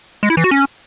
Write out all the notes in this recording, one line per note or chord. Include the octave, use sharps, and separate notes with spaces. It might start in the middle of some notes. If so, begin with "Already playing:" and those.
G#3
E4
E3
F#4
C#4